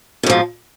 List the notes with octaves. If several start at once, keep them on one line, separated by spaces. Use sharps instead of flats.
G#2 B2 F3